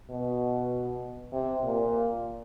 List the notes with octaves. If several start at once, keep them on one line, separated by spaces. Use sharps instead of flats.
B2
C3
A#2